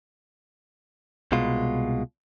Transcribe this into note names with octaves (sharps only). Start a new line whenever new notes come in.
C2 B2 G#3 F4